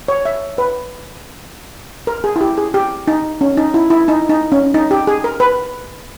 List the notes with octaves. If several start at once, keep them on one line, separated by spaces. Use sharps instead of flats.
C#5
E5
B4
A#4
G#4
E4
G4
G#4
G4
D#4
C#4
D#4
E4
E4
D#4
D#4
C#4
D#4
G4
G#4
A#4
B4